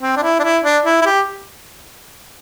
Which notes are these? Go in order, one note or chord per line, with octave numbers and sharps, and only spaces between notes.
C4
D4
E4
D4
E4
D4
E4
E4
G4